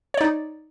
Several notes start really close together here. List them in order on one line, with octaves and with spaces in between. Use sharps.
C#5 D5 D#4